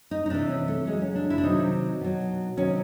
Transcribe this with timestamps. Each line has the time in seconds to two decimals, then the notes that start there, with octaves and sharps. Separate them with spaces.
0.11 D#4
0.26 D#4
0.30 C3 E3 D4
0.49 C#4
0.68 A3
0.87 C#3 F#3 G#3
1.02 C#4
1.15 D4
1.30 E4
1.38 D4
1.43 C3 D#3 F#3 D#4
2.01 B2 F#3
2.57 C3 D#3 F#3 C#4